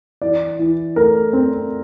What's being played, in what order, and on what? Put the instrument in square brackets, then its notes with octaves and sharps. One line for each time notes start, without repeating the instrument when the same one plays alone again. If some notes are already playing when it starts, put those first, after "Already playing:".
[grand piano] E3 D5
E3
A3 A#4
C4